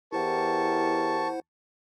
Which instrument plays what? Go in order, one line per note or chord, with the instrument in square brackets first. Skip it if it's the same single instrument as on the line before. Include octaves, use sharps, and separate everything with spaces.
[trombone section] E2 G4 A#4 [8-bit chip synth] E4 C5 F#5 [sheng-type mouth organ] A5 C#6